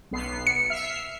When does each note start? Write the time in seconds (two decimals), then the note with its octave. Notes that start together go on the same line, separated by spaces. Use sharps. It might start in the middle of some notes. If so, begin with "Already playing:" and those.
0.11 B1 B3 C7
0.47 C#7
0.70 E5 F6 C7